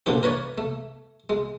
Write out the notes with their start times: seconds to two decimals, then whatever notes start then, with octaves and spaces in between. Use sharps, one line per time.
0.06 A#2 D3 E3 F3 G4
0.23 A#4 B4 C#5 D5
0.58 A3
1.29 G#3